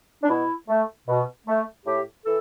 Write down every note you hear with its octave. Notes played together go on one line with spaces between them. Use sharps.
D4
B2 E4
A3
B2
A3
A2 G4
E3 A4